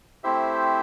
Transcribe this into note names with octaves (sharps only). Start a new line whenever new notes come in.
A3 C4 E4 G4 C5 E5